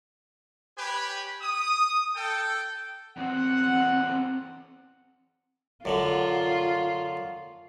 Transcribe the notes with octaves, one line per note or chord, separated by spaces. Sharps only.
G4 B4 C#5 G#5 B5
D#6
A4 G5
E2 C4 F#5
F#2 D3 F#3 F4